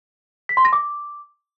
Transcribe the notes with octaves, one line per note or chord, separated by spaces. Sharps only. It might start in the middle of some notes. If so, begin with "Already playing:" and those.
B6
C6
A#6
D6